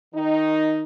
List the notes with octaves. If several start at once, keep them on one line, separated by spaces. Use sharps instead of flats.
D#3 D#4